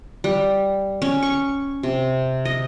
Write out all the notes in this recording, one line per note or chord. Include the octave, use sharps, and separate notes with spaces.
G3
C#4
C#6
C3
D#5